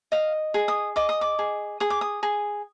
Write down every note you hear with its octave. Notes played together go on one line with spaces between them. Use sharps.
D#5 F5
G#4
D#6
D#5 D6
D#6
D6
G#4
G#4 D#6
D6
D#6
G#4